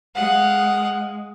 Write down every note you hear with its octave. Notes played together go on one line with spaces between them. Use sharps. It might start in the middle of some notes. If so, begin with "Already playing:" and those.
G#3 F5 F#5